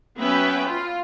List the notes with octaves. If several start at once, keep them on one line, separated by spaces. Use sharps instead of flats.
F#3 B3 C#4 B4 E5 G5
F4